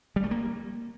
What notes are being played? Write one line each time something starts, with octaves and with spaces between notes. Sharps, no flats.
G3
A3
A#3